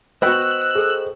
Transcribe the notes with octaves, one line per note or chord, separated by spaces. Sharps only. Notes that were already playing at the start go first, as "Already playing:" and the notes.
B3 F#4 C5 D#5 G5 E6 F#6
G#4 A4